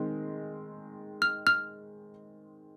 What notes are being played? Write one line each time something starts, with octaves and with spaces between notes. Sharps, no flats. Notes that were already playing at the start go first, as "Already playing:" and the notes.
Already playing: D#3 G#3 C4
F6
F6